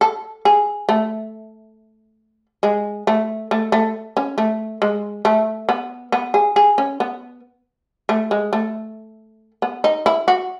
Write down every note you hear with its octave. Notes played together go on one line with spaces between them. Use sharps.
A4
G#4
A3
G#3
A3
A3
A3
C#4
A3
G#3
A3
B3
B3
G#4
G#4
C#4
B3
A3
G#3
A3
B3
D#4
E4
F#4